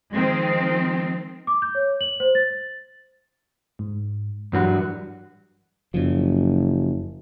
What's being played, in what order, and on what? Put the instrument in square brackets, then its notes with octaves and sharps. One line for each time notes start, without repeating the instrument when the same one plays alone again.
[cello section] D#3 F3 G#3 C4
[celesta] D6
G6
C#5
F#7
C5
A6
[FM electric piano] G#2
[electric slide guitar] G2 F#4 [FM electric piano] E3 F#3 G3
[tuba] F#1 [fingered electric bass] F#2 C#3 F3